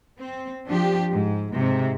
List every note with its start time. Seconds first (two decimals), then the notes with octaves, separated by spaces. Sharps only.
0.19 C4
0.67 F3 D4 G4
1.12 G#2
1.53 G#2 C3